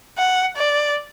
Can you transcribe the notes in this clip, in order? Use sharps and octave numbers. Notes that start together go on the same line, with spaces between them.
F#5
D5